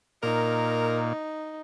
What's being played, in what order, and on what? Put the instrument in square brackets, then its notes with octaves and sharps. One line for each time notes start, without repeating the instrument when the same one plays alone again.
[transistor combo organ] A#2 [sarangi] D#4 [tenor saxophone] A#4